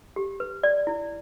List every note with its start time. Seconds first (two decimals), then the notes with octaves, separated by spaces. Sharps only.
0.16 G4
0.40 B4
0.63 D5
0.87 E4